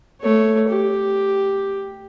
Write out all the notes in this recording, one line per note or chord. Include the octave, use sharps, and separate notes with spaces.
A3 C#5
G4